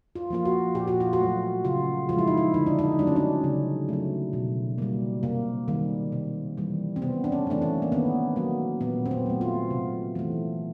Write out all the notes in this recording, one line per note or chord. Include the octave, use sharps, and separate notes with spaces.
F4
F3 A#3 F4
F#4
A#2 G4
F#4
F4
F#4
F#3 A3
C#3 F4
F3 G#3 F4
E4
D#4
E4
D3 D#4
D4
D#4
F#3 A3 D4
C#4
D4
C#3
F#3 A3
B2
G3 A#3
C3 A#3
D#3 G3 A#3
C3
E3 G3
C4
C3 B3
D4
C#4
E3 A3 D4
C#4
A#3
D#3 B3
F#3 A3 A#3
A#2 B3
C4
B3
F#3 A3
F4
C3
E3 A3